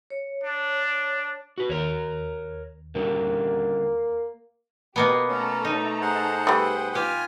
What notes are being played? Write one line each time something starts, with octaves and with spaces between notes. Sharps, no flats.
C#5
D4
F#4 B4
D#2 A#4 C#5
D3 G3 A#3 C#4
B2 A#3 B3 G4
A3 C#4 A4 A#5
D#4
G#4 C5 F#5
G3 A3 B4 G5
F4 G4 G#5 F6